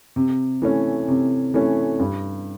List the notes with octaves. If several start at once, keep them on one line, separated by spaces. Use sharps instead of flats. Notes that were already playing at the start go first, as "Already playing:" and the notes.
C3
E3 A3 C#4
C3
E3 A3 C#4
G2